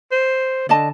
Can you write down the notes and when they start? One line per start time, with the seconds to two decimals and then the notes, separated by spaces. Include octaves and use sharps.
0.12 C5
0.69 D3 D5 D#5 A5